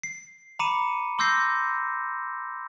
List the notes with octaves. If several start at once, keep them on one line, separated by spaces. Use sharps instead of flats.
C7
A#5 B5 D6 C#7 D#7 E7
C6 D6 E6 G6 A#6 C7